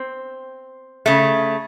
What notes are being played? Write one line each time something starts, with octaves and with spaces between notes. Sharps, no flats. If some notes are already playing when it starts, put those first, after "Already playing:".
Already playing: C4
C#3 A3